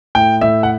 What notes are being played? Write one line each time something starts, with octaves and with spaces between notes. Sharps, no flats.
A2 G5
A2 E5
F#5